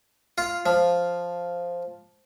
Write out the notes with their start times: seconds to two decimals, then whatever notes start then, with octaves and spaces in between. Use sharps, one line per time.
0.38 F4
0.66 F3